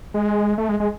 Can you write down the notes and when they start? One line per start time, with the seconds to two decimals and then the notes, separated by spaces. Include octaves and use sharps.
0.14 G#3
0.58 A3
0.69 G#3
0.80 G#3